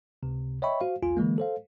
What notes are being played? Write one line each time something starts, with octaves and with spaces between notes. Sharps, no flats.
C#2 C3
C#5 D#5 E5 G5 B5 C#6
F#4 C5 F5
B1 E2 F4 G#5
D3 E3 G#3 A#3
A4 C5 F5